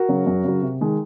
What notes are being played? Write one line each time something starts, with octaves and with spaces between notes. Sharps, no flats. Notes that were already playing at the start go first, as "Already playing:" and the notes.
Already playing: F#4 A#4
C#3 F#3
F#2
C#3 F#3
C3
D#3 G#3